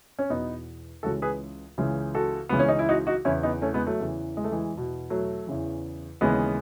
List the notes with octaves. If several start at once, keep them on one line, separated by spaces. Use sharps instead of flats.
C#4
E2 B2 B3 D#4
C#2 C#3 E3 F#4 A4
G#4 B4
C#2 C#3 E3
F#4 A4
C#2 C#3 E3 B3
C#4
D#4
E4
D#4 F#4
D#4 F#4
E2 C#3 E3 C#4 E4
B3 D#4
A3 C#4
G#3 B3
F#3 A3
E2 C#3 E3
G#3
A3
E3 G#3
E2 B2
F#3 A3
E2 C#3 E3
D#2 C#3 E3 G#3 B3